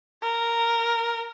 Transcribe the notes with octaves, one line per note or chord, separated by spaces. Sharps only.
A#4